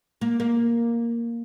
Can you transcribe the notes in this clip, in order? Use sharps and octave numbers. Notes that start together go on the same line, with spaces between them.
A#3
A#3